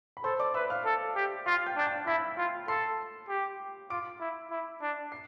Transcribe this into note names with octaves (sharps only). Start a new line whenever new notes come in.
B5
A4 C5 C6
D5 D6
B4 E5 E6
F5 F6
A4
G4
F4 F5 F6
G5 G6
D4 G6
A5 A6
E4 B5 B6
F4
A4 C6 C7
G4
F4 D6 D7
E4
E4
D4
C7